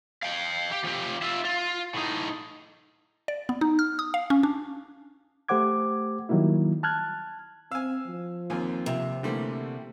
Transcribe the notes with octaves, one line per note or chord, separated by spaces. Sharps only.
F5 G5
G4
F3 G4
F4 E5
F4
A2 D#4
D5
B3
D#4
F6
D#6
F5
C#4
D4
A3 G4 C5 F#5 D6 G#6
D#3 F#3 G3 A#3 E4
A5 F6 F#6 G#6
C4 F5 G#5 E6
F3
D#2 A#3 C4 F4 G#5
C3
D3 E3 G3 A3 A#3 C4